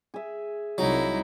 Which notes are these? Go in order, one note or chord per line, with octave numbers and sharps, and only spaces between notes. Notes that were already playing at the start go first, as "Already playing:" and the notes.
G#4 E5
C2 F#3 D#4 E4